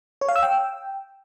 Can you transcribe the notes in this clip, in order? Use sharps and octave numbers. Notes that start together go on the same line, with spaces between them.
C#5
F5
E6
G5